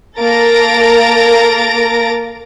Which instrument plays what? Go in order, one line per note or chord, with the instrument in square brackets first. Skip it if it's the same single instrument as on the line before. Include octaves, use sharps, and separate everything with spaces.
[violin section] A#3 A4 A#5 A6 A#6 D7